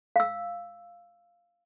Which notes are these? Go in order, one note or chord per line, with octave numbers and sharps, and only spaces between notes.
F5 E6